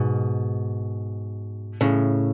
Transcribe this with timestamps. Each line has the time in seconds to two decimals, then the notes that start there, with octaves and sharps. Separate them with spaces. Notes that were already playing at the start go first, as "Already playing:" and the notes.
Already playing: G#2 B2
1.81 A2 C#3